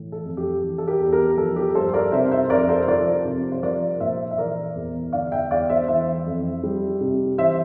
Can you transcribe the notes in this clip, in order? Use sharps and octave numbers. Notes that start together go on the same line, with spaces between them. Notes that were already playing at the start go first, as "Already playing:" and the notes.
Already playing: A2 E3
A4
F2
G4
E3
A4
G4 A#4
E2
G4 A#4
F3 A4
G4 A#4
G2 A4 C5
A#4 D5
C3 C5 E5
C5 E5
F2 A#4 D5
A4 C5
F3 A#4 D5
C3
C5
F3 A#4 D5
A#2 C5 E5
E5
E3 A#4 D5
E2
D3 D5 F5
E5 G5
E2 D5 F5
C5 E5
E3 C5 E5
F2
G3
C3
E3 C5 E5